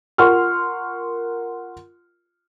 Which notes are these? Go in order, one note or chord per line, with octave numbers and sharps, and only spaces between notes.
F4 A#4 F#5 C6 C#6 F6